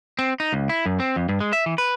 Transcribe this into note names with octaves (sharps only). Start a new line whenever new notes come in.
C4
D#4
C#2
E4
F#2
C4
F2
G2
G#3
E5
E3
B4